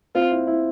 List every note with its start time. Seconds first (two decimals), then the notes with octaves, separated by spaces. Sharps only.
0.15 C4 F4
0.31 E4
0.47 E4